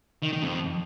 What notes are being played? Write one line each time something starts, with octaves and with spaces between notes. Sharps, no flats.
D#3
D#3
F2